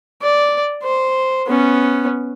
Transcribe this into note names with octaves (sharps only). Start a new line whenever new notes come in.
D5
C5
B3 C#4